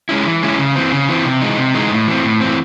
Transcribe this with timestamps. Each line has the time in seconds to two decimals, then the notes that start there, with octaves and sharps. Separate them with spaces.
0.09 G#3 C#4 E4
0.26 E3
0.42 G#3 C#4 E4
0.59 C#3
0.75 E3 C4
0.92 C#3
1.09 E3 C4
1.25 C3
1.41 E3 G#3 D#4
1.58 C3
1.74 E3 G#3 D#4
1.91 A2
2.07 E3 C4
2.24 A2
2.41 E3 C4